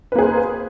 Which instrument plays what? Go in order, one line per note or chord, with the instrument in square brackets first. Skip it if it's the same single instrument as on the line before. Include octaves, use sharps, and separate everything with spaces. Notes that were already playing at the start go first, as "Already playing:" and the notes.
[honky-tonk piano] B4
A#3
G#4
C5